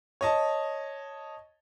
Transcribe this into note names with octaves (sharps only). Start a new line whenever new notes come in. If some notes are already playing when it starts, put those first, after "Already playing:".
C#5 D#5 A5